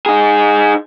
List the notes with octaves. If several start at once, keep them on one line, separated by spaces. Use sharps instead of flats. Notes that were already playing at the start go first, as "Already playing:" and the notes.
D#4 G#4